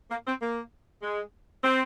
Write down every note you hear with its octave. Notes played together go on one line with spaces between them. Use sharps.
A#3
C4
A#3
G#3
C4